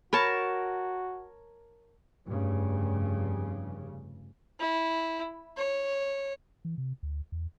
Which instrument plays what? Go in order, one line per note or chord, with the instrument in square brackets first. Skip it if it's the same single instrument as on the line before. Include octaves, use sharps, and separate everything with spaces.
[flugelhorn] F#4 [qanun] A#4 C#5 A5 [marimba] B5
[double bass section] F1 G2 C#3
[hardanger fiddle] E4
C#5
[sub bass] E3
C3
D2
E2